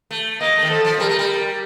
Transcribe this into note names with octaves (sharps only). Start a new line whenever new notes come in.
A3
A#3 D#5
A3
D#3
F3 A4
F3
G3 A#4
A3
G3